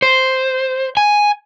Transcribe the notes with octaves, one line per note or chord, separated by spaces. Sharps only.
C5
G#5